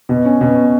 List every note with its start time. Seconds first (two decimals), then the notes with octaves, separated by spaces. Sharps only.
0.09 B2
0.25 C#4
0.41 B2